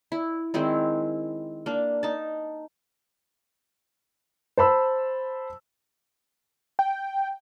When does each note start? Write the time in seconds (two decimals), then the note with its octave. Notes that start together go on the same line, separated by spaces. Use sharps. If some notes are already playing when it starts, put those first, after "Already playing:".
0.12 E4
0.54 D#3 G#3 C4 E4
1.66 A#3 D4
2.03 D#4 A5
4.57 C5 A5 B5 E6
6.79 G5